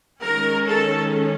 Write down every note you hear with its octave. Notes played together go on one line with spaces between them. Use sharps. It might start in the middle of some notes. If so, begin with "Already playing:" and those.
D#3 G#3 C#4 A#4
A4